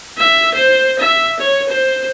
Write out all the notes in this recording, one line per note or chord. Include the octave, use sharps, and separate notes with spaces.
E5
C5
E5
C#5
C5